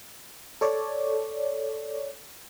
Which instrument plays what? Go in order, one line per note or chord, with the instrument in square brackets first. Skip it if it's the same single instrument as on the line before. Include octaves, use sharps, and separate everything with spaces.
[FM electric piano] A4 C#5 D5